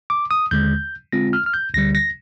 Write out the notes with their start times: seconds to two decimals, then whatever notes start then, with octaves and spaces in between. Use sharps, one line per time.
0.10 D6
0.31 D#6
0.51 D#2 D3 G#3 G6
1.12 D3 G#3 C4 F4 A#6
1.33 F6
1.46 F6
1.54 G6
1.74 D2 D3 G3 A#6
1.95 A#6